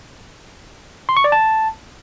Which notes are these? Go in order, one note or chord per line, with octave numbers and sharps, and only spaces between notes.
C6
C#6
D5
A5